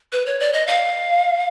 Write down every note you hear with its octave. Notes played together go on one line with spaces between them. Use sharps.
B4
C#5
D5
D#5
F5